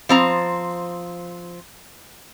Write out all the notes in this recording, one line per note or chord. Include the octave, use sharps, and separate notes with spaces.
F3 C4 A#5